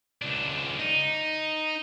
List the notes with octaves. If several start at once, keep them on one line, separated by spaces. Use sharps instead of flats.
C#2 D4
D#4